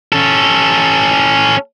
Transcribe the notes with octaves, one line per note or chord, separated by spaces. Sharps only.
C#4 A4